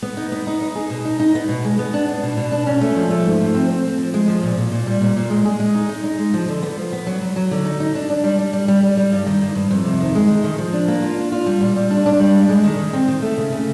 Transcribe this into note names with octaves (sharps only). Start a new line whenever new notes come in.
B3
D#4
B3
D#4
D#4
G#4
B2
D#4
D#4
B3
B2
G#3
B3
D4
D4
B2
B2
D4
C#4
A3
F3
A3
G#2
F3
C4
C4
C4
F3
G#3
F3
A#2
A#2
A#2
G3
A#2
A#2
G#3
G#4
G#3
D#4
D#4
D#4
G#3
F3
D3
B3
F3
B3
F#3
F#3
F#3
D3
D#4
D#4
D4
D4
G3
G3
G3
G3
G3
G3
G2
D#3
G2
G2
F2
C3
D#3
G#3
D#3
D#3
F3
D4
A#3
F4
D4
F4
G3
A#2
G3
D4
D4
G3
G#3
G#3
D#3
D#3
C4
D#3
A3
C#3
C#3